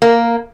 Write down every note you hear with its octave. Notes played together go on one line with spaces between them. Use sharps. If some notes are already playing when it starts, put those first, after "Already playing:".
A#3